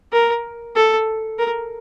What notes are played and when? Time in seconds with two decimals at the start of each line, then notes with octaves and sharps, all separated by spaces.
0.12 A#4
0.76 A4
1.39 A#4